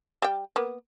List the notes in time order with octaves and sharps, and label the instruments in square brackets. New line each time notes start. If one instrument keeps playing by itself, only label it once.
[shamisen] G3 G5
A#3 B3